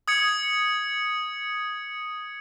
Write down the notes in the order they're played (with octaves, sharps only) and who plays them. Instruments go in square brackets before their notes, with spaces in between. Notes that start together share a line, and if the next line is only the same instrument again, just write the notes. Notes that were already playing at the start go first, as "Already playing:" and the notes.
[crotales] D#6 G#6 C#7